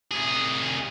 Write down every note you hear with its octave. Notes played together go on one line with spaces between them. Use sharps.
C2 G#4